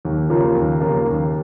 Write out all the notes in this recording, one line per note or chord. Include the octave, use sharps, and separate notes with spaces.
D#2
C#3 F3 A#3 F4
D#2
C#3 F3 A#3 F4
D#2